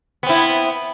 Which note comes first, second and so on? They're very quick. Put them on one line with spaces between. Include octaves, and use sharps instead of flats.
B3 C4 E4